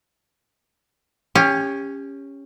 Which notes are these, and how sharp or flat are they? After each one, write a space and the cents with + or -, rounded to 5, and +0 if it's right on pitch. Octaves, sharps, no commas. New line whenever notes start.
C#4 +0 G4 +30